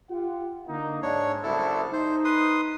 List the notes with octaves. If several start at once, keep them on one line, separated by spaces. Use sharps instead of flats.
F4 G4 F#5
D3 A#3 D#4
G#2 D4 C#5
F#1 C2 E4 A4
D#4 C5
B4 C6 D#6